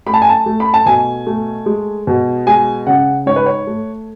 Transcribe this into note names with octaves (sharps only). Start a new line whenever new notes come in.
A3 B5
A5
G#5
A5
A3
B5
A5
B2 G#5
A3
G#3
B2
G#3 G#5
C#3 F#5
G#2 C#5
B4
C#5
A3